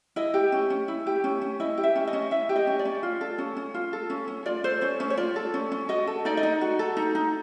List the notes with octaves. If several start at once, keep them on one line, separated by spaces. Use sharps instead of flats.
E4 D#5
G4
C#4
C#4
E4
G4
C#4
C#4
E4 D#5
G4
E5
C#4
D#5
C#4
E4 E5
G4
D#5
C#4
D5
C#4
F4
A4
C#4
C#4
F4
A4
C#4
C#4
F4 D5
A4 C5
C#4 C#5
C#4 C5
C#5
F4 D5
A4
C#4
C#4
F#4 D#5
A4
D#4 D5
D#5
D#4
F#4
A4
D#4
D#4